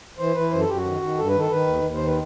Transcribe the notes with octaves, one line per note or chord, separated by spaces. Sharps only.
E3 C5
E3 B4
F#2 C5
A4
F#2 G4
F#4
D#3
D#3
G2 A4
B4
D#3 A4
D#3 B4
D#2
D#2
C5
D#3
B4